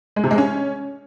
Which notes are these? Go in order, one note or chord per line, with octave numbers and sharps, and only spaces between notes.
G#3
C3
G#3
C#4